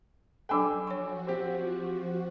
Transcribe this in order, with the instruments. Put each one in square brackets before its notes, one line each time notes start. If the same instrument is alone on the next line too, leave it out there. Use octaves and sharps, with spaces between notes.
[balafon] F#3 D4 A4 [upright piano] G5 G#5 E6
[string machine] F3 F#4 [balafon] C#5 C#6
[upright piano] C4 G4